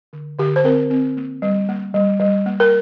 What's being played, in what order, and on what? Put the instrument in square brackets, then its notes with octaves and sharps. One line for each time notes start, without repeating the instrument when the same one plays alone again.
[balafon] D3
D3 G4
C5
C4 A#4
C4
A#3
G3
A#3
G3
G3
A#3
A#4